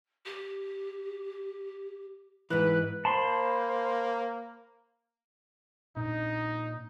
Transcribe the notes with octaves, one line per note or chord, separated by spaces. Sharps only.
G4
G#2 E3 B4 F#6
A#3 C5 A5 B5 C6
A#2 C4 D4 D#4